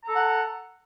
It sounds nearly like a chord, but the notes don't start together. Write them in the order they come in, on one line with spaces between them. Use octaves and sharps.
A#5 A4 F#5